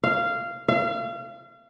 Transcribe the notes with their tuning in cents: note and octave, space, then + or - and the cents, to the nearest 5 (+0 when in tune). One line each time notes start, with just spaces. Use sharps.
F5 -15
F5 -35